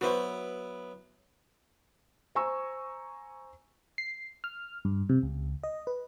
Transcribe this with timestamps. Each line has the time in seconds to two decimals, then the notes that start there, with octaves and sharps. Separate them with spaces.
0.01 F#3 B3 E4 F#4 B4 C5
2.35 C5 G#5 A#5 C#6 E6
3.98 C7
4.44 F6
4.85 G2
5.09 C3
5.23 C#2
5.64 D#5
5.87 B4